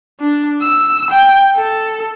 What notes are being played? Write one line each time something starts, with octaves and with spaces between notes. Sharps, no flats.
D4
E6
G5
A4